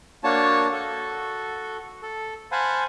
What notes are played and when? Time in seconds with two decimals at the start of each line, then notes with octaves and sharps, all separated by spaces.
0.24 A#3 D4 F#4 C#5 A5
0.72 F#4 A4
2.02 A4
2.52 C5 F5 F#5 G#5 A5 B5